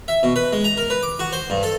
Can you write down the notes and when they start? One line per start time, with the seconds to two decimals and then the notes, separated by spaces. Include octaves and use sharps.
0.08 E5
0.23 B2
0.36 B4
0.53 G#3
0.64 A#5
0.77 A#4
0.90 B4
1.03 D6
1.19 F#4
1.33 C5
1.50 G2
1.63 A4